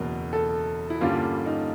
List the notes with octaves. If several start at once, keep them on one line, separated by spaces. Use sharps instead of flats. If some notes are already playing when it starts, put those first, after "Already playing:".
Already playing: F#1 E2 B2 A#4
A4
E4
G2 D3 G3 A#3 C#4 F4
D#4